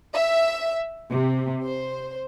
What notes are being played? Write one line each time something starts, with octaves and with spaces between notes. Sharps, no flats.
E5
C3
C5